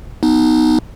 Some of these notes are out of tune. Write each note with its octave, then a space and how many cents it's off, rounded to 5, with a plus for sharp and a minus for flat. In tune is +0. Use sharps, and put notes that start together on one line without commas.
B3 +0 D#4 +0